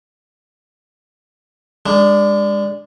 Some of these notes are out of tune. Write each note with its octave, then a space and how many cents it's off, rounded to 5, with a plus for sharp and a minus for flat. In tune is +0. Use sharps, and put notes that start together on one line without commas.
G#3 -30 D4 +0